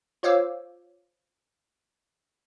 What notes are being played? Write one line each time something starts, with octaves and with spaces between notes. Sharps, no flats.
F4 C5 C#5 F5 D6 E6